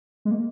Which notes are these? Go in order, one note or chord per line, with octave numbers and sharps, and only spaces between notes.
G#3
A#3